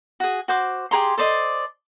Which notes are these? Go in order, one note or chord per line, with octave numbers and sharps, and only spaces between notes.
F#4 G#4
F#4 C5 D6
G4 G#4 A#5 C6
A4 C5 D5 D#5